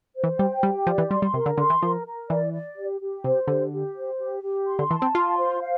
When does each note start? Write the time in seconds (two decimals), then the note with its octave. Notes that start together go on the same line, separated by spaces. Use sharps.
0.16 C5
0.24 E3
0.39 G3 G5
0.63 G3 G4
0.87 F3 D5
0.98 E3
1.10 G3 C6
1.22 G3
1.34 C3 A#4
1.46 D3
1.58 D3 C6
1.70 E3
1.82 F3 A#4
2.06 A#4
2.29 E3 D5
2.53 D5
2.77 G4
3.01 G4
3.24 C3 C5
3.48 D3 G4
3.72 G4
3.95 C5
4.19 G4
4.43 G4
4.67 C6
4.79 D3
4.91 E3 A5
5.02 C4
5.14 F4 C6
5.38 C5
5.61 F5